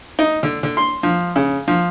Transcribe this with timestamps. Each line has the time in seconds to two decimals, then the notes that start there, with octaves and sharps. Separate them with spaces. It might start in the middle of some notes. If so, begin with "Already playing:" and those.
0.19 D#4
0.43 D3
0.63 D3
0.77 C6
1.03 F3
1.36 C#3
1.68 F3